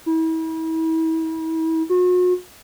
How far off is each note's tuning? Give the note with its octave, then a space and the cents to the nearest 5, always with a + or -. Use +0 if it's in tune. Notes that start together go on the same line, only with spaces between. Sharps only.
E4 -35
F#4 -40